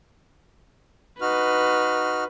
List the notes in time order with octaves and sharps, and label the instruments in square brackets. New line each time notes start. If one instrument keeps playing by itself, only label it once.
[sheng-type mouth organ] D#4 F#4 F6 [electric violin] B4